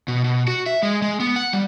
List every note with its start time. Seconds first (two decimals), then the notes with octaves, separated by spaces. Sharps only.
0.08 B2
0.24 B2
0.48 F#4
0.66 E5
0.83 G#3
1.02 G#3
1.20 B3
1.36 F#5
1.53 G3